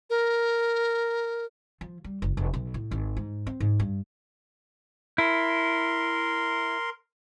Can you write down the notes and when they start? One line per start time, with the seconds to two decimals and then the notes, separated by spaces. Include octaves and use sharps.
0.10 A#4
1.81 F3
2.04 G3
2.22 F#1
2.37 F1
2.54 B1
2.74 A2
2.91 G#1
3.17 G#2
3.47 C4
3.60 G#2
3.80 G2
5.18 E4 A#4 C6